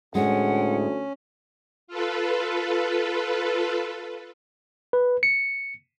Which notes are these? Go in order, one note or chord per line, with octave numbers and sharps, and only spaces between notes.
D2 A2 G#3 C#4 F#5
F4 A4 B4
B4
C#7